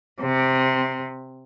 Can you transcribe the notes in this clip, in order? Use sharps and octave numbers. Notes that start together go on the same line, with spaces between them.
C3